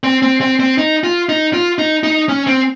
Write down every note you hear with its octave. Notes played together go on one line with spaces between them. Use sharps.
C4
C4
C4
C4
D#4
F4
D#4
F4
D#4
D#4
C#4
C4